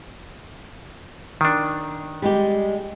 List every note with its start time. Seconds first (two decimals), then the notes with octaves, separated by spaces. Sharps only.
1.41 D#3 D4
2.22 G3 G#3 G4